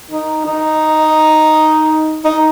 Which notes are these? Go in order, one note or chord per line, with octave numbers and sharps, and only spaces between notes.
D#4
D#4
D#4